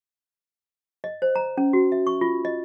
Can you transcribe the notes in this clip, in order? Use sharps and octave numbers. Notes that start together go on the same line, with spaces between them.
D#5
C5
A#5
C#4
F#4
E5
C#6
F4
D#5